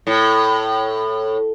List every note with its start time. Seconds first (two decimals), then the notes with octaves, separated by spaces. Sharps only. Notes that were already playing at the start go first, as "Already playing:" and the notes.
0.07 A2